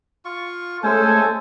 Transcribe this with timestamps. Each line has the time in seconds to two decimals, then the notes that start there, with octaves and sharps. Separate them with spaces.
0.25 F4 C#6
0.83 G#3 A3 C#4 A4 C5 G#5